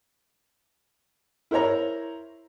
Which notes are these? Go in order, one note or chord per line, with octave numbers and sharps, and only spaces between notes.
E4 A#4 C5 C#5 A#5